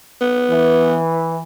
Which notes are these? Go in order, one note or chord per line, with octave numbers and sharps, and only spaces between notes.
B3
E3